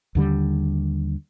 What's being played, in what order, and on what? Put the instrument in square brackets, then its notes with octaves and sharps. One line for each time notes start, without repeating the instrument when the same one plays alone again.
[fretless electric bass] D#2 D3 G3